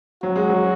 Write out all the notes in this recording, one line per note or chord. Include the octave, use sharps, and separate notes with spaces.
F#3 F#4
G#3
F#3